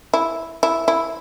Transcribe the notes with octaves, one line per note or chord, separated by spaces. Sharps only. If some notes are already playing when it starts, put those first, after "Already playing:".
E4
E4
E4